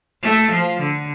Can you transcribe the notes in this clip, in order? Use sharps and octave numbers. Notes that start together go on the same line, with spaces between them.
A3
F3
D3